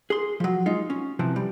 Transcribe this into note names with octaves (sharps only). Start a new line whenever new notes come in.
G#4 C6
F3 F#3
G#3 D#4 F4
C#4
C3 E3 F3
G3